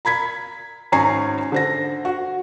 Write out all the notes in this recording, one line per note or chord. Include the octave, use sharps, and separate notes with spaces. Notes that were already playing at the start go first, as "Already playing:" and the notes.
A#5 B5 G#6 B6
G#1 C#4 G#5 A#5 C#6 C7
D3 C5 A#6
F#4